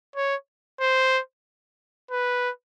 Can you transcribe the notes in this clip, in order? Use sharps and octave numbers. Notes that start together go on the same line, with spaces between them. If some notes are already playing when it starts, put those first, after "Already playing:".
C#5
C5
B4